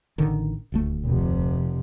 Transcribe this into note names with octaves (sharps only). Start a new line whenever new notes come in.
A1 D3 D#3
D#1 D2 A3
F1 C3